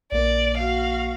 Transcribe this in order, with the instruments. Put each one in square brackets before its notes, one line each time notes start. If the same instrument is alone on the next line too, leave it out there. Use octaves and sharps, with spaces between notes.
[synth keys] A#1 A#3 [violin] D5
[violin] F#4 F5